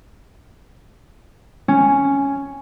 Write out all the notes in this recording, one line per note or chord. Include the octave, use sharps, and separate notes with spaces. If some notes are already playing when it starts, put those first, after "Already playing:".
C#4